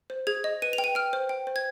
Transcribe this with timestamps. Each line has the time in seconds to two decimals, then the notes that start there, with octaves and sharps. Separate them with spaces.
0.10 C5
0.27 G#4 G#6
0.44 D#5
0.62 B4 D#7
0.73 F7
0.78 G5
0.84 D#7
0.95 G5 F6
1.13 C5
1.29 G5
1.47 C5
1.56 G#6